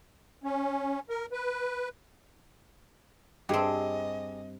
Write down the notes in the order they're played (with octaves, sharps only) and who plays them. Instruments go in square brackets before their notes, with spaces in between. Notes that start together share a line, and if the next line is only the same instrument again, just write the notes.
[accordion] C#4
A#4
B4
[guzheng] G2 C4 [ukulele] G4 G#4 [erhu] D#5